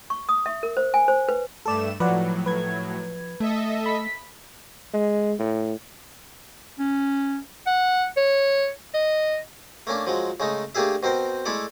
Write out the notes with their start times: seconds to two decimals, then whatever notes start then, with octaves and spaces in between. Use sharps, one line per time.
0.10 C#6
0.29 D#6
0.46 E5
0.63 A#4
0.77 C5
0.94 G#5
1.08 C5
1.29 B4
1.66 G2 A3 A4 D5 E7
2.00 A2 F3 F#3 B4 D5 F#5
2.46 B4 G#6
3.40 A3 A4 D#5 E5
3.86 B5 B6
4.93 G#3
5.39 A2
6.79 C#4
7.66 F#5
8.17 C#5
8.94 D#5
9.87 A3 A#3 C#4 D4
10.07 F3 F#3 G#3
10.40 C#3 G#3 A3 D#4
10.75 A3 A#3 D4 G4 G#4 E5
11.03 B2 C4 A#4 C5
11.46 G#3 A3 E4 A4 D5